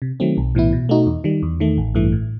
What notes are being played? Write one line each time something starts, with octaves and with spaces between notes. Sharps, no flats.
C3
D#3 F#3 A3 C4
B1
A2 E3 B3 E4
B2
A3 D#4 F#4
E2
D#3 G3
E2
D#3 A3
A1
G2 E3 A3
A2